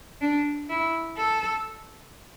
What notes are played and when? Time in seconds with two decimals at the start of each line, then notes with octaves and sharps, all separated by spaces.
0.21 D4
0.70 E4
1.17 A4